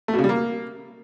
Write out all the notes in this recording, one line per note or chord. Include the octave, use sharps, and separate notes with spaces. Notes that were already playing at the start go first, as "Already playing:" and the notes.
A3
B2
C#3
G3
A#3